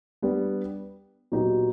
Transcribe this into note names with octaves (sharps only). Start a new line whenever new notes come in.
G3 B3 D4
A#2 F#3 B3 D#4 G4